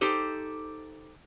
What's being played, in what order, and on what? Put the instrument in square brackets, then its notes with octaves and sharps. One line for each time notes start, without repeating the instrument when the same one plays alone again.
[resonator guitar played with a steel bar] D#4 G4 A4 C5